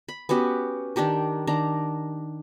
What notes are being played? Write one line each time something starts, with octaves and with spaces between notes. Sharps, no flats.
B5
B3 C#4 F#4 G4
D#3 D4 G4 A#4
D#3 D4 A#5